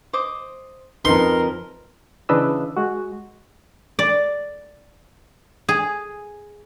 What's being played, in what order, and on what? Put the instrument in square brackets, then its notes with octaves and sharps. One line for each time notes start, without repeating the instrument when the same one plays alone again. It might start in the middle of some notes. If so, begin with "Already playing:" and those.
[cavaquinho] C5 D#5 D6
[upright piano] F2 B4 [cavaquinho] D#4 [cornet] A#4 [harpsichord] C6
[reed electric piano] C#3 E3 D4 B4 D#5 E6
G#3 F#4
[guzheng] D5
G#4